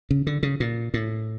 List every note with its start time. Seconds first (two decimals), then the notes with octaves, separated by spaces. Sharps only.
0.11 C#3
0.27 D3
0.43 C#3
0.60 A#2
0.94 A2